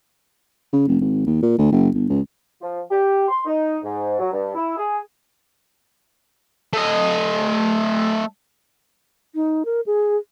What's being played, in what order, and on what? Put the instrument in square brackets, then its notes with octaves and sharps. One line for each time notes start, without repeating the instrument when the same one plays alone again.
[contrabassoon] C#3
F1
G#1
D#2
A#2
D2
F#1
G1
C#2
[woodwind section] F3
G4
C6
D#4
G#2
F#3
G2
E4
G#4
[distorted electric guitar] A3 D#5
[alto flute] D#4
A#4
G#4